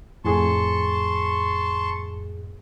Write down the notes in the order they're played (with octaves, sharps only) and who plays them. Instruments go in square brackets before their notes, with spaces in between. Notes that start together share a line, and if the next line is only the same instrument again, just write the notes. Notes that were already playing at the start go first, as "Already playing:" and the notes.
[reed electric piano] F2 A2 G#4 [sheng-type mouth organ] A5 C6 C#6